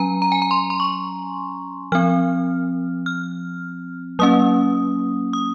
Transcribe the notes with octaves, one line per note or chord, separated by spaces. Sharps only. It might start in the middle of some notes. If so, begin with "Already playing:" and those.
Already playing: F#3 C#4 G#5 A#5
A#5
G#5
A#5
C6
C6
C#6
F3 C4 F6
F6
F#3 A#3 C#4 D#6
D#6